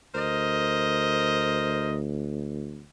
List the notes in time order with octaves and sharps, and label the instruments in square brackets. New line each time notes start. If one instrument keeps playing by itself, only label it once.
[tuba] D2 [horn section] A#4 C5 D#5